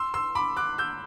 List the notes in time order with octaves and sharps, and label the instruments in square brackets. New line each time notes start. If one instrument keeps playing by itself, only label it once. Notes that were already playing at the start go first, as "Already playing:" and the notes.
Already playing: [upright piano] C6 E6
C6 E6
B5 D6
D6 F#6
E6 G6